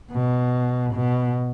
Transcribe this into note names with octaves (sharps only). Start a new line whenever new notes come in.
B2
B2